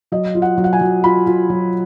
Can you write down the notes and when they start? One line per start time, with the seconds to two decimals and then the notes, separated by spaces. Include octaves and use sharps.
0.12 F#3 D#5
0.35 F4
0.42 F#5
0.57 F#3
0.64 F#5
0.73 G#5
0.81 F#3
1.04 F4 B5
1.26 F4
1.50 F#3